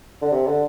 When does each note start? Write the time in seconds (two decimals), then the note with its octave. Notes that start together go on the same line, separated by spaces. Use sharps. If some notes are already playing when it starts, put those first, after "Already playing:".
0.21 D3
0.31 C3
0.47 D3